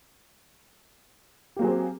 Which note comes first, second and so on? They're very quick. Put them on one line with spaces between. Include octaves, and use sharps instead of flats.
G4 A#3 F#3 G#4 C4